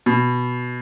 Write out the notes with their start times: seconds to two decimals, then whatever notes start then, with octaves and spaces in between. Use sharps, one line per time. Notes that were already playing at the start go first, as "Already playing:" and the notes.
0.06 B2